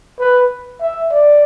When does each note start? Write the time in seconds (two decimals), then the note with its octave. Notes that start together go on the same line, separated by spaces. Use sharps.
0.20 B4
0.81 E5
1.12 D5